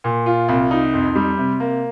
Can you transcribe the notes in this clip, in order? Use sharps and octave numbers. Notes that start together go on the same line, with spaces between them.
A#2
F4
C2
D#4
F2
G3
C3
A#3